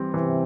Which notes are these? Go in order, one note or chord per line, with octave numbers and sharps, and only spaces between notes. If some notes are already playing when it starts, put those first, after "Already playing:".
Already playing: E3 G3 C4
C3 E3